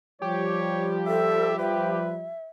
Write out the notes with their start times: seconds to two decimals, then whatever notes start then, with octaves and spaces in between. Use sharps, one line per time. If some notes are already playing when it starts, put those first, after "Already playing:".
0.22 F3 G3 G4 C#5
1.07 A4 E5
1.59 B4 E5